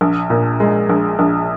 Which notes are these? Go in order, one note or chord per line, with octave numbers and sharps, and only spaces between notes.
A#1
A#2
G#3
A#1
A#1